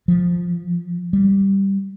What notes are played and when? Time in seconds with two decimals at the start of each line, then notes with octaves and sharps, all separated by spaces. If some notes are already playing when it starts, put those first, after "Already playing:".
0.08 F3
1.13 G3